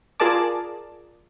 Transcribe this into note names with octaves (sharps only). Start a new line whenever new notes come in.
F4 G#4 A#4 D5 A5 D6